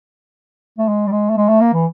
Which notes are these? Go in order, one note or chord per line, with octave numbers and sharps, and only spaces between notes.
A3
G#3
G3
G#3
A3
G#3
A3
A#3
E3